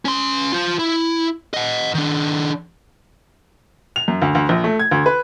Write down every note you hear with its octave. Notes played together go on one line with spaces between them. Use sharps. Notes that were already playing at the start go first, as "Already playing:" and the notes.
C#4 C6
F4 C5
E4
D#5 F#5
D#3 D4
F7
F#2
D2
D2
A#1
A3
G#6
D2
B4